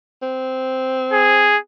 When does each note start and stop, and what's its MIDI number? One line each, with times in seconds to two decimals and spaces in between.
0.22 1.58 60
1.13 1.58 68